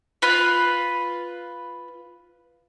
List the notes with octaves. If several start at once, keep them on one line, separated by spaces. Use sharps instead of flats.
F4 B4 B5